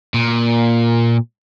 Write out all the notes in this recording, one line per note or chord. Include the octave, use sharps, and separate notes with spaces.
A#2